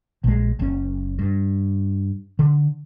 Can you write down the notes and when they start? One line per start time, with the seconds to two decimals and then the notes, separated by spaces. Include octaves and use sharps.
0.24 A#1 G#3
0.59 F#1 C#4
1.19 G2
2.39 D3